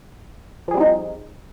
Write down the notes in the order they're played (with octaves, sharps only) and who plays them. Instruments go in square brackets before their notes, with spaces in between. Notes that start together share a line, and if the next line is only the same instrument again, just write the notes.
[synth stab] F3
G#4
G3
C4
D#4